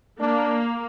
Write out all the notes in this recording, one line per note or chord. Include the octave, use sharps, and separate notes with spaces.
A#3 D4